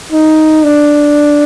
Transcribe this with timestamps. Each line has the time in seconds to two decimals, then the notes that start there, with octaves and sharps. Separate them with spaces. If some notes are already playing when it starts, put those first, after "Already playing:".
0.13 D#4
0.64 D4